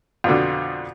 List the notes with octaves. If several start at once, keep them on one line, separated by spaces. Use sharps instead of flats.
F2 B2 D3